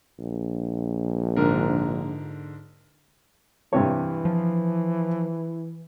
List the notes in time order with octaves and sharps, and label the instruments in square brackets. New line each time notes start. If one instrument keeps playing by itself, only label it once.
[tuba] A#1
[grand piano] G#2 D3 A#4
[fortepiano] G2 C3 C#5 [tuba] E3
[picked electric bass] F3